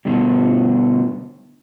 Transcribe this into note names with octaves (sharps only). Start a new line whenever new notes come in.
G2 B2 D3